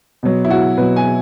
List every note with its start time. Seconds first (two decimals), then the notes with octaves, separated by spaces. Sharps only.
0.23 B2 F#3
0.45 E4
0.51 F#4
0.78 B2 F#3 B4
0.96 G#5